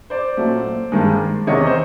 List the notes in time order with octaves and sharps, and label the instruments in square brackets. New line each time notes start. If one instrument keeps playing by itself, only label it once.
[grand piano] C5 D5
A#2 F#3 A3
G2 D#3 G#3
E2 C3 D#3 C#5 D#5
C5